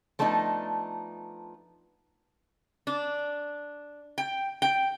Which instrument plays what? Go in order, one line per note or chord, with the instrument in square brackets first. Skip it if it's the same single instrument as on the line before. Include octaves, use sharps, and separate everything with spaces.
[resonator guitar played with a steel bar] F3 A3 B3 D4 D#4
D4
G5
G5